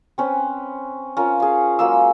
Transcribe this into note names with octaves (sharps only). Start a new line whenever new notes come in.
C4 C#4 B4
C#4 F4 A#4
G#4 F5
F#3 G#3 A#3 E6